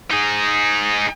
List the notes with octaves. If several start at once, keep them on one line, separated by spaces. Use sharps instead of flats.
D#4 G#4